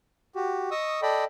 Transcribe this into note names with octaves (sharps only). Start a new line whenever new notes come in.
F#4 G4
D#5 C#6 D#6 E6
A4 D5 D#5 G5 B5